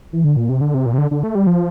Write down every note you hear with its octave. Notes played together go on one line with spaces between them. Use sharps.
E3
D3
A#2
C3
D3
C3
A#2
C3
D3
D3
A3
G3
F3